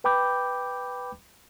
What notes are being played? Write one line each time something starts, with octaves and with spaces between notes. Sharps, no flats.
B4 G5 B5 D6 G6